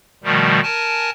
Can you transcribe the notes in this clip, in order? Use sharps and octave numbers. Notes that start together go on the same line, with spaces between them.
B2 D#3 F3 G3 A3
A#4 G#5 A5